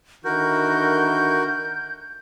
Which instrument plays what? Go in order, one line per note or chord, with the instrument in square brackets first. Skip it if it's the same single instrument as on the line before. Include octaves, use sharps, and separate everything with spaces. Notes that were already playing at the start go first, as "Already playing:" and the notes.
[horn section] D3 D#3 E4 [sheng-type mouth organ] F#4 A#4 [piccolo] G6